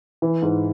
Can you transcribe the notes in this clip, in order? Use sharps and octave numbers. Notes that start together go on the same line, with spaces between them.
E3
G#2